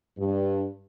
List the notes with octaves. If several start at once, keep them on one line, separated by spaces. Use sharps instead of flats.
G2